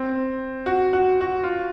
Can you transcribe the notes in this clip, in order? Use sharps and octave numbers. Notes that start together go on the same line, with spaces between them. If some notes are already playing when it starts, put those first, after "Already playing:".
Already playing: C4
F#4
F#4
F#4
F4